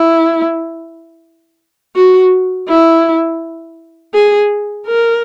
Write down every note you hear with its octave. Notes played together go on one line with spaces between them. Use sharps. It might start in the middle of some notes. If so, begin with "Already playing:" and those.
Already playing: E4
F#4
E4
G#4
A#4